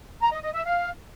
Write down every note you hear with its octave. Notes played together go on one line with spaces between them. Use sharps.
A#5
D#5
D#5
E5
F5